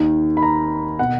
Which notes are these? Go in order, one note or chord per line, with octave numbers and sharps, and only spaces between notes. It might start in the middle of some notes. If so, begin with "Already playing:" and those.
Already playing: D#2 D#3
B5
A#5
B2 F#5